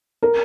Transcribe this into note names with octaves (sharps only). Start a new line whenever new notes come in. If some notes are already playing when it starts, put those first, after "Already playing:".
A#4